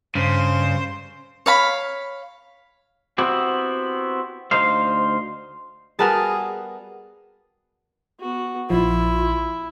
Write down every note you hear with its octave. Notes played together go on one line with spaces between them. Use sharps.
G2 C#3 C5
C#5 F5 B5
B3 C4 E4 F#4 G4
D2 D#4 C5 F5
G3 B3 F#4 G#4 A#4 B4 A5
B3 F#4
A#1 F3 E4 F4